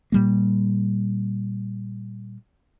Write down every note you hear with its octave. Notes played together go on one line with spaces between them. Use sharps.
A#2 G3 A#3